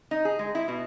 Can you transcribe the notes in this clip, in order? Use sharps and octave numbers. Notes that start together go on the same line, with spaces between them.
D#4
G#4
G#3
E4
B2